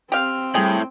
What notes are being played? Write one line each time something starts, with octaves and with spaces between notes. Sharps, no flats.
C4 G4 F5
A2 G3 G#4 G5